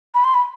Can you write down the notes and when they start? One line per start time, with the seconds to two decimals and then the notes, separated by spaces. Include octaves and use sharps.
0.14 B5
0.24 C6
0.34 B5